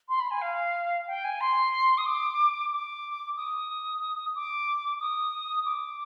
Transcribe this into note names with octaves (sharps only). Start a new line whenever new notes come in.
C6
B5
G#5
F5
G5
G#5
C6
D#6
D6
D6
D#6
D6
D#6
D6